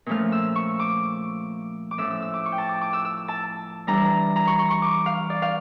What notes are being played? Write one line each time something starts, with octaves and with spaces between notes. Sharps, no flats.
A#2 F3 A3 C#4 F6
E6
C#6
D6
D6
A2 F3 C#4 E6
E6
E6
D6
C#6
G5
A5
D6
D6
E6
E6
A5
E3 G3 D4 A#5
A#5
C#6
C#6
C#6
D6
F5
D5
F5